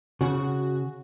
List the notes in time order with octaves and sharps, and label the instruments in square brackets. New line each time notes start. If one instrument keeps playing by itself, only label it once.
[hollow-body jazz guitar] C#3 [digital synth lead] F#4